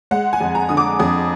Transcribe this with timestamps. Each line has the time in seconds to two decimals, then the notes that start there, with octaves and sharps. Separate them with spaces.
0.11 G#3 F#5
0.33 G#5
0.41 F2
0.55 A#5
0.69 D3 D#6
0.77 D6
0.99 F2 D#6